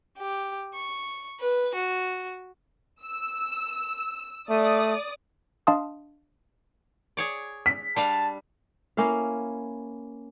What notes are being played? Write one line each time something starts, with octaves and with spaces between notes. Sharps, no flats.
G4
C#6
B4
F#4
E6
A3 D5 D#6
D4 D#5 F5 A5 C6 D#6
G#4 C#5 D5
B6
G3 D4 F5 A5
A#3 C#4 E4 F5